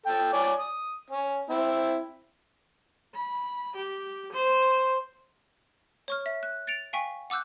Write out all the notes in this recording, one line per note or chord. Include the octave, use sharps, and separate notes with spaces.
A4 G5
C#5 D5 G#5
D#6
C#4
C4 E4
B5
G4
C5
C#5 C#6 F6
E5
F#6
A6 C#7 D7 F7
F5 G5 G#5 C#6 B6
F#5 D6 E6 F#6 G6